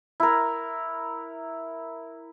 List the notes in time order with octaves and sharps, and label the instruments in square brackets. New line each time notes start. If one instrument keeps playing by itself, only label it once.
[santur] E4 A#4